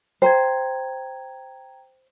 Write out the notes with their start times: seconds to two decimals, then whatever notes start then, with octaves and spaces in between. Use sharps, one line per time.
0.22 C5 G5 A#5 G#6